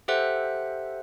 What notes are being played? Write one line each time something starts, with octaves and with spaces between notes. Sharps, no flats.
G4 A4 C5 E5 F#5 F#6